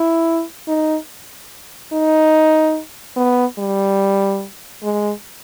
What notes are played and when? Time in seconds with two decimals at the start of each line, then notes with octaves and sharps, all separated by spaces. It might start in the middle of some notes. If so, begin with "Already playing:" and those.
Already playing: E4
0.68 D#4
1.93 D#4
3.16 B3
3.58 G3
4.83 G#3